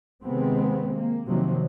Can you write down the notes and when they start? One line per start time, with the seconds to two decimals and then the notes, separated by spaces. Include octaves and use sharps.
0.23 C3 D#3 G#3 B3 C4
0.97 A#3
1.28 C3 D#3 F3 F#3 A#3 C4